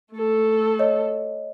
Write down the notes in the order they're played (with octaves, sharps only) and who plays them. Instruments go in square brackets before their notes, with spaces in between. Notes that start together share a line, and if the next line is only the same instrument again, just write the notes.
[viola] A3 A4
[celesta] C#5 D#5